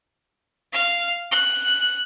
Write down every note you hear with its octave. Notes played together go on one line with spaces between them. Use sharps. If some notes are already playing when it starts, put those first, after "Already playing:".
F5
F#6